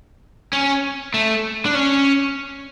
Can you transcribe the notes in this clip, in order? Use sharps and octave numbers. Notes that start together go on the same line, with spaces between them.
C#4
A3
D4
C#4